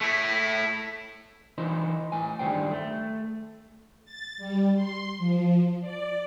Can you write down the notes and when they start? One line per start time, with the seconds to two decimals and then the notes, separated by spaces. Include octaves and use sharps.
0.01 A3 E4
1.58 E3 D#4 C5
2.12 A2 G#5
2.39 G2 D#3 E3 G3 C5 G5
2.71 A3
4.05 A6
4.38 G3
4.75 C6
5.18 F3
5.81 D5